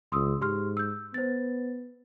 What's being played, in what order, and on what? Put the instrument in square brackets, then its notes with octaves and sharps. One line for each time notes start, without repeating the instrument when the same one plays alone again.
[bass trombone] C#2 [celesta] C6 D#6 E6
[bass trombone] G#2 [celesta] G4 C6 F6
[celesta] E6 G6
[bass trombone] B3 [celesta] C5 A6